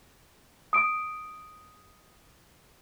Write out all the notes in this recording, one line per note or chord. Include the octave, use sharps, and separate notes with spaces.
D#6 D7